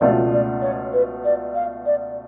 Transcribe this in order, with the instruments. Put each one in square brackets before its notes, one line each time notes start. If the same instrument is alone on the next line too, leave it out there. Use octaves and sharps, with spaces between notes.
[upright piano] C#2 B2 A3 C#4 F4 [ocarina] D5
[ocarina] D5
C#5
B4
D5
F5
D5